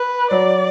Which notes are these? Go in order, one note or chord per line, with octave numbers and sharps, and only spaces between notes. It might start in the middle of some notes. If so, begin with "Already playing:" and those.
Already playing: B4
F#3 D5